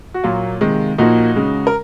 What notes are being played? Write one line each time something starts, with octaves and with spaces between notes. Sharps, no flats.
F#4
A#2 F#3 A#3 F4
C3 D#3 G#3
A#2 F3 A#3 D#4 F#4
C#3 G#3
A#4